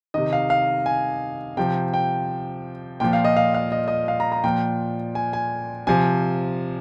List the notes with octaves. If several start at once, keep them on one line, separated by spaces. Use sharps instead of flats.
C3 D#3 D#5
F5
F5
G#5
C3 F3 G5
G5
A#2 F3 G5
F5
D#5
F5
F5
D#5
D#5
F5
A#5
A#5
A#2 F3 G5
G#5
G#5
C3 F3 G#5